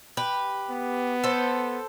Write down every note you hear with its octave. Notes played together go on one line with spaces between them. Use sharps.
G4 B4
B3
A4 C5